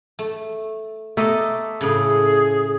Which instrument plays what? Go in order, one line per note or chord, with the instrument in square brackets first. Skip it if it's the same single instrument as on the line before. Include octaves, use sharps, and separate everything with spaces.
[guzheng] A3
[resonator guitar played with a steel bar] A3 [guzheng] A#3 D#5
[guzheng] A2 C#3 [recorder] G#4